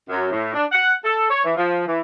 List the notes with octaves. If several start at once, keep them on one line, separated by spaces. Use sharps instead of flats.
F#2
A2
D4
F#5
A4
C#5
E3
F3
E3